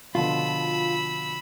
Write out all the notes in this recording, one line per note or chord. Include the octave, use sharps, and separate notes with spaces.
B2 D3 F3 F4 B5 E6